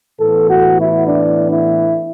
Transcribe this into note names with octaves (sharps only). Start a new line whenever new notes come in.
A2 E3 B3 A4
F#4
E4
D4
E4